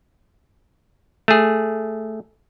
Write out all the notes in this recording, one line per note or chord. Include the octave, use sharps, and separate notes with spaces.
A3 G#4